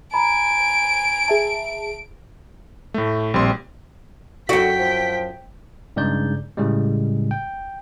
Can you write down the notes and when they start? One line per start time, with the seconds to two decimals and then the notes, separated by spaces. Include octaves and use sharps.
0.14 G#5 A#5 B5 D7
1.28 G#4 E5 A5
2.94 A2 A3
3.34 A#1 G3 C4 C6
4.49 F#2 D3 F#4 G5 B6
4.79 F3
5.96 G2 C#3 G#3 D#4 D5 G6
6.57 A2 C#3 G3 G#3
7.31 G5